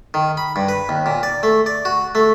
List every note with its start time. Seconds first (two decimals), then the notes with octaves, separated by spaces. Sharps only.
0.14 D#3
0.37 B5
0.56 G2
0.68 B4
0.89 D#2
1.06 A#2
1.23 D5
1.43 A3
1.66 D5
1.85 F#4
2.15 A3